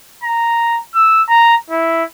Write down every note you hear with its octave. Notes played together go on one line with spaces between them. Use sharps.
A#5
E6
A#5
E4